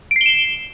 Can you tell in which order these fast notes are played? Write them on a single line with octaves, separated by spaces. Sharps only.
D7 C7 G7 E7